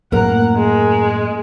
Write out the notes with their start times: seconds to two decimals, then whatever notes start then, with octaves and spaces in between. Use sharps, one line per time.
0.12 F#2 A2 A#3 A#4 F#5 A#5
0.56 G#3